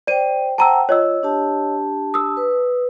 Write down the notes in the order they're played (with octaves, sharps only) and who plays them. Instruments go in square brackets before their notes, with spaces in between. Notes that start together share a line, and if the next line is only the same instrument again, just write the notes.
[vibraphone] C5 G5 [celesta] D5 D#7
[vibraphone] C5 F#5 G5 [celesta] A5 A#5 E6
[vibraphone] F4 [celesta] C#5 D#5 E6
[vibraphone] D4 G4 A5
[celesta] D#6 E6
[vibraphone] B4